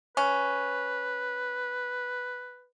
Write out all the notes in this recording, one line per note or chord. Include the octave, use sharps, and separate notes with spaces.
C#4 B4